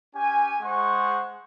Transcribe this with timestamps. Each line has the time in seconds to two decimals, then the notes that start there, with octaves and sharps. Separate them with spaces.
0.15 C#4 G4 G#5
0.61 G#3 G#4 C5 F#5 C#6